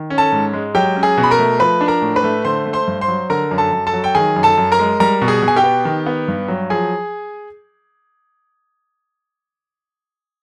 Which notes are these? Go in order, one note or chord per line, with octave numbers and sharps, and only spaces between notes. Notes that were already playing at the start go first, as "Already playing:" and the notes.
Already playing: D#3
C#4
A4 A5
G#2
G#3
F#3 G4 G5
C#4
G#4 G#5
B2
B5
A#4 A#5
A3
F3 B4 B5
D4
A#4 A#5
A2
B4 B5
A3
D3 C5 C6
A3
C5 C6
G2
C5 C6
F#3
D3 A#4 A#5
F#2
A4 A5
F#2
A4 A5
F#3
G5
D#3 G#4 G#5
F#2
A4 A5
F#2
A#4 A#5
G#3
G3 A#4 A#5
B2
G#4 G#5
B2
G#5
G4 G5
B3
D#3
B3
G2
F#3
F3 G#4 G#5